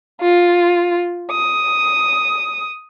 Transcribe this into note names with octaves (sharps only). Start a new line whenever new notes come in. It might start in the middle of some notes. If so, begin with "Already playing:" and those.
F4
D#6